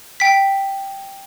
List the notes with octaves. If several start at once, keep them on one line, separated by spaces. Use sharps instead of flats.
G5 B6